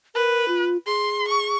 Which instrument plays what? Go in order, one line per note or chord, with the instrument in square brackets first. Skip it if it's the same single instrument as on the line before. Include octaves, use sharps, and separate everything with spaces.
[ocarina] A#4 [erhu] B4
[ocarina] F4
[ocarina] G#4 [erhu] C6
[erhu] C#6